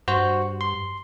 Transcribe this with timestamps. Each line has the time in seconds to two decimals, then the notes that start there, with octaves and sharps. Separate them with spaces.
0.08 G2 F#4 C5
0.61 C6